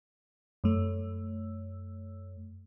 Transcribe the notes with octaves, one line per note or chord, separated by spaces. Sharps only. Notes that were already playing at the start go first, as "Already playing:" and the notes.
F#2 A3